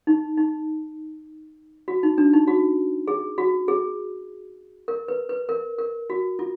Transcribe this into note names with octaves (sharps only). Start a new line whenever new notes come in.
D#4
D#4
F#4
D#4
D4
D#4
F#4
G#4
F#4
G#4
A#4
B4
B4
A#4
A#4
F#4
F4